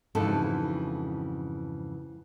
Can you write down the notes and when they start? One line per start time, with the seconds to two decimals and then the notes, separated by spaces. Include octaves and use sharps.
0.15 F2 G#2 C#3 E3 F#4 A4